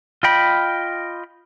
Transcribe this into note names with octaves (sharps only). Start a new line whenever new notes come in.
F4 D#5 G5 B5